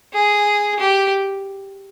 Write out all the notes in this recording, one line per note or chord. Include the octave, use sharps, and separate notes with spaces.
G#4
G4